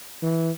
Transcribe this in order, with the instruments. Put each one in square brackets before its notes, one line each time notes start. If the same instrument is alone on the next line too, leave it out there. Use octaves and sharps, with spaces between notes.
[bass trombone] E3